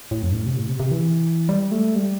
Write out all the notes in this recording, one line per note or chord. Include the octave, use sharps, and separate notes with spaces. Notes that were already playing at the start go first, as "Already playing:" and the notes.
A2
F2
G2
A2
C3
A2
C3
C3
E3
G3
A3
G3